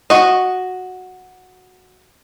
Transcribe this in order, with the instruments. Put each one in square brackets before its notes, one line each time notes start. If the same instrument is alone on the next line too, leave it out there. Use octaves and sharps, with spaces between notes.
[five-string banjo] F#4 D#5